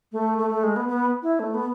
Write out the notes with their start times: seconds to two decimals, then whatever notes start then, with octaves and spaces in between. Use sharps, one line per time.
0.12 A3
0.38 A3
0.50 A3
0.64 G#3
0.76 B3
0.88 B3
1.23 E4
1.40 A3
1.54 B3